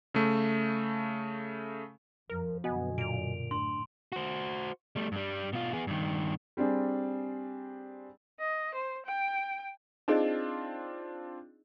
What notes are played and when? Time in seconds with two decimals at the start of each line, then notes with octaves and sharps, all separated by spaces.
0.14 C#3 A3
2.30 F2 F3 A#4
2.64 F#2 B2 D3 B3 F#4 D#5 G#5
2.98 A#2 D7 F7
3.51 A2 D4 C6
4.12 F#4 C5
4.96 G3 A3
5.12 G2 G3
5.53 B2 F4
5.73 B3 G#4
5.87 G2 D#3
6.57 G3 C4 D4 G#4
8.40 D#5
8.74 C5
9.06 G5
10.08 C4 D4 D#4 F4 G#4 D#5